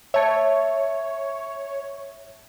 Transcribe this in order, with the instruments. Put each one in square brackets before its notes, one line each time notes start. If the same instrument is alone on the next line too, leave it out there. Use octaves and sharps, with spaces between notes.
[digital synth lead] C#5 [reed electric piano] E5 A5